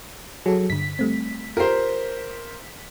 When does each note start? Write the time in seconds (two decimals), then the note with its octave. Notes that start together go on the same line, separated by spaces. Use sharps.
0.46 F#3 G#4 A4
0.70 G2 D3 B6
0.99 G3 A3 C4
1.57 F4 G4 A#4 C5 C7